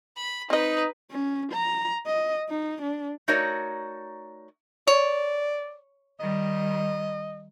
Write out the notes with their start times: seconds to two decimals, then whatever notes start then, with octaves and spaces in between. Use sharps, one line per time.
0.17 B5
0.50 C4 D#4 B4 D#5
1.11 C#4
1.52 A#5
2.06 D#5
2.49 D#4
2.82 D4
3.28 A3 D#4 F#4 A#4 C#5 D5
4.87 C#5 D5
6.20 D#3 G3 D#5